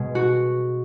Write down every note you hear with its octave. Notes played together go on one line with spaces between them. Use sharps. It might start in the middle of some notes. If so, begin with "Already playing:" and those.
Already playing: B2 G#3
F#4